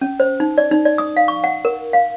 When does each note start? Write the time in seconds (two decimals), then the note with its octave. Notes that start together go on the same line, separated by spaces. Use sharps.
0.01 C#4
0.20 C5
0.40 D#4
0.58 D5
0.71 D#4
0.85 D5
0.98 D#6
1.17 F5
1.28 C#6
1.44 F#5
1.65 A#4
1.93 F5